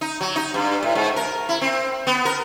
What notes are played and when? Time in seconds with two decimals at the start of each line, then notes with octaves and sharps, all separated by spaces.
0.01 D#4
0.21 F#3
0.36 D#4
0.54 G2
0.83 A2
0.95 G#2
1.16 A#4
1.49 E4
1.61 C4
2.07 B3
2.25 A#4